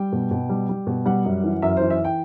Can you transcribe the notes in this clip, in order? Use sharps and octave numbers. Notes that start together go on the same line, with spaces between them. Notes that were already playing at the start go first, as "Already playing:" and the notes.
Already playing: G3 G5
B2
B2
G3
G3
B2
G3 F#5
F#2
E3
F#2 E5
E3 C5
E5
G5